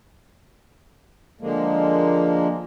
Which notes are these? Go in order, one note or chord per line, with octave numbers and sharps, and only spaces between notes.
D3 F3 G#3 A#3